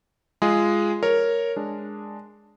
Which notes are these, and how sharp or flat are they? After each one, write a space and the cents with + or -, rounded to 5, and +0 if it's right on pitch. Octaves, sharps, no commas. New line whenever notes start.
G#3 +0 F4 -20 G#4 +0
A#4 +0 C#5 +0
G#3 +0 D4 +0